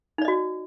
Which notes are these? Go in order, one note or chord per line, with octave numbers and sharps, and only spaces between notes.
D#4 F#4 D5 D#5